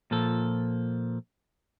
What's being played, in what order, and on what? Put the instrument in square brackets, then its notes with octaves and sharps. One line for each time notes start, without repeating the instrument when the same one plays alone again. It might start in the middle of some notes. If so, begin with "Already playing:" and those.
[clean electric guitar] A#2 F3 A4